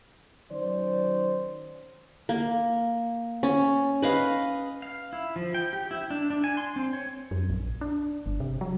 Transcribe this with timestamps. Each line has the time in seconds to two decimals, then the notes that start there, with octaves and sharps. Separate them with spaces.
0.51 D#3 F#3 C#4 C5 D5
2.29 A#3
3.43 C#4
4.02 B4 D#5 F5
4.82 F5
5.13 E4
5.36 F3
5.54 G5
5.73 G4
5.91 E4
6.10 D4
6.30 D4
6.44 G#5
6.57 C6
6.76 C4
6.93 C#5
7.31 F#2
7.50 A#1
7.81 D4
8.26 G1
8.40 C3
8.61 F#3